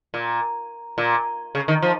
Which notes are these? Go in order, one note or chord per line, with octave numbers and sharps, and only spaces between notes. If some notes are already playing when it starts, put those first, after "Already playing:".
A#2
A#2
C#3
D#3
F3